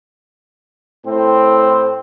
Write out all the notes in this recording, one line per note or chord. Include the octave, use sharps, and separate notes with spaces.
A2 C4